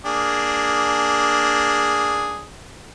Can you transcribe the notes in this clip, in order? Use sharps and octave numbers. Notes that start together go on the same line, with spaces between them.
A#3 D4 G#4